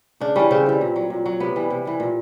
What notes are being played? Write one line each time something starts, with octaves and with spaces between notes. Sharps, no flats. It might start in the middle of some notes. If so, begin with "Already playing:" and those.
C#3 D4
E3 G3 C#4
C#3 C4
E3 G3
A#2
F#3
A#2
F#3
C3 B3
E3 G3
C3
E3 G3
A#2